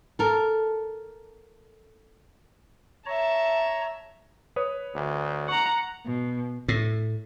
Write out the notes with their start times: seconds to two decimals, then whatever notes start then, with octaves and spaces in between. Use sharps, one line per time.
0.19 A4 A#4
3.06 C#5 E5 A5 A#5
4.56 B4 C#5 D#6
4.95 D2
5.49 F#5 A#5 C#6
6.06 B2
6.68 A2